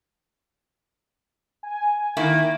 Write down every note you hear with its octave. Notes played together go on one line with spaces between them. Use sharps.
G#5
D#3 A#3 E4